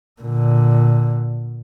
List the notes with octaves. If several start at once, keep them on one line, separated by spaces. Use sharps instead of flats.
A#2 D3